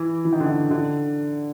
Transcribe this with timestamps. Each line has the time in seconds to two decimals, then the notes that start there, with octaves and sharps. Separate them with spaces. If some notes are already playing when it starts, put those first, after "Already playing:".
Already playing: E3
0.25 E3
0.32 D#3
0.40 D3
0.47 D#3
0.71 D3